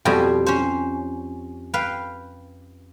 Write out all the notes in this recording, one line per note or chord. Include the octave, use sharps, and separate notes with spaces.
F2 B2 G3 C5 G#5
C#4 C5
B4 F5 G5